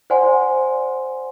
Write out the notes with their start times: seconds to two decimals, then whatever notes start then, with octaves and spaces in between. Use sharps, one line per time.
0.10 C5 D5 F#5 G#5 C6